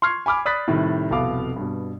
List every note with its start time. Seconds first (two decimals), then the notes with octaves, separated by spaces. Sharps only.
0.02 C6 C#6 F6 G#6 C7
0.26 G#5 B5 D6 F6
0.45 D5 B5 D#6 F#6 A6 B6
0.68 A2 C3 D#3 G3
1.10 F1 C2 B2 A4 F5 D6
1.56 G2 B2